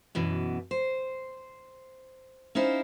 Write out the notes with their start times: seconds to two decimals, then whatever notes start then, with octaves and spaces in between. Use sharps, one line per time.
0.15 F#2 B2 E3
0.71 C5
2.55 C#4 D#4 E4 C5 F5